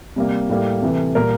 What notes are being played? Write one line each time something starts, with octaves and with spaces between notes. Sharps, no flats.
C3 G3 A#3
A2 G3 A#3
C3 E3 A3
A#2 G3 A#3 A#4